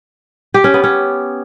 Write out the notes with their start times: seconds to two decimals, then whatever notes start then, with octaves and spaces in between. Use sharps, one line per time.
0.54 G4
0.64 C#4
0.74 B3
0.84 C#4